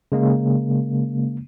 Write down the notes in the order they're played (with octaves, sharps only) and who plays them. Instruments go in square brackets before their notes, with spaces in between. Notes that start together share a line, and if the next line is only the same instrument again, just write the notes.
[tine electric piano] C#3 G#3 A#3